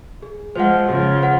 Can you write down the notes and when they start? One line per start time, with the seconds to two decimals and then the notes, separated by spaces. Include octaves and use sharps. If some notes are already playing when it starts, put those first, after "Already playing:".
0.22 G#4
0.56 F3 G#3 C5 F#5
0.89 C#3 F3 G#4
1.23 C5 F#5